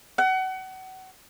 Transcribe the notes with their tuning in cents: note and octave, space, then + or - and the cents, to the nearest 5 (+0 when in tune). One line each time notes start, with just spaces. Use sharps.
F#5 +30